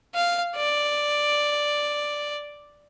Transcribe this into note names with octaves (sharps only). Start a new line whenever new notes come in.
F5
D5